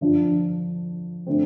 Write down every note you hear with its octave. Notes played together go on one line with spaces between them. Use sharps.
D3 F3 D4
D3 A3 C4